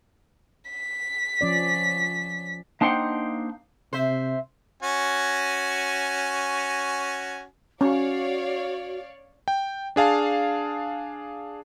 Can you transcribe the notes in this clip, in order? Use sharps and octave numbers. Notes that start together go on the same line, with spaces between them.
B6
F3 C#4 D5
A#3 D4 D#4 C5 F#5 G5
C3 C5 E5
C#4 F#4 G#5
C#4 F#4 C#5 D5 F5
G5
D4 G#4 F5 A5